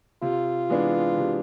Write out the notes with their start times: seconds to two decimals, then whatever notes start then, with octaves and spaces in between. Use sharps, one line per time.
0.22 C3 F4
0.70 E3 G#3 B3 D4
1.17 C3